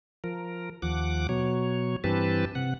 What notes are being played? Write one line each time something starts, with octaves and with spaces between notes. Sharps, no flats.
F3 A#4
D#2 F3 F#5 D6
B2 F#3 C#5
G2 E3 C4 G4 B4 A5
C3 F#5